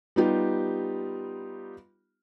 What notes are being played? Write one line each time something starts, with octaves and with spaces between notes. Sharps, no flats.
G3 B3 D#4 F4 G4